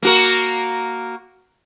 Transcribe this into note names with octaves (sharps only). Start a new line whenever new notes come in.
A#3 F#4 A#4